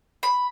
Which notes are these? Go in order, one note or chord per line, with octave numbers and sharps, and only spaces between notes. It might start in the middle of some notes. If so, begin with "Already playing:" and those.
B5